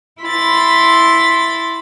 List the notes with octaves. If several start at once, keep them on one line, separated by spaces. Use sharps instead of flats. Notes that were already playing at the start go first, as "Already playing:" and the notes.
E4 B5 C6 A6